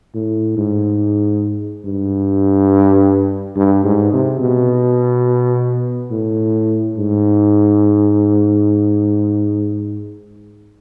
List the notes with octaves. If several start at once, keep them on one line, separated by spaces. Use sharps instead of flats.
A2
G#2
G2
G2
G#2
C3
B2
A2
G#2